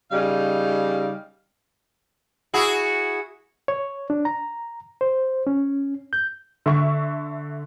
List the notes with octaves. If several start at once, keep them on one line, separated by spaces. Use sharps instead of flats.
C#3 G3 D#4 F5
E4 F#4 G#4
C#5
D4
A#5
C5
C#4
G6
D3 E5 C#6